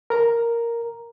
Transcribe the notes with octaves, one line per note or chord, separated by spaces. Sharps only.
A#4 A#5